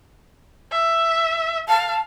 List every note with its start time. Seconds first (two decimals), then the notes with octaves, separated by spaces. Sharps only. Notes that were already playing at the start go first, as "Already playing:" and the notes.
0.72 E5
1.69 F5 A5